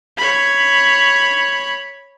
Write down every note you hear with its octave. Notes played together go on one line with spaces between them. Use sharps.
C#5 B5